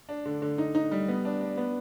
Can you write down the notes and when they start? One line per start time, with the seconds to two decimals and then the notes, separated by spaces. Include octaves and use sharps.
0.09 D4
0.25 D3
0.42 D3
0.58 D#4
0.75 D#4
0.91 G3
1.08 B3
1.25 D4
1.41 D4
1.57 B3